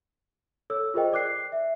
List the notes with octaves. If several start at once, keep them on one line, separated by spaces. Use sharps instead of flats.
A4 C#5 E6
F4 G#4 A#4 C5 D#5 G5
D5 D6 F#6 C7
E5